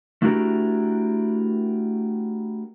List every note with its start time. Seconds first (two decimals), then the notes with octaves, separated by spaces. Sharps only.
0.22 A3 D4 E4 F#4 G4 A#4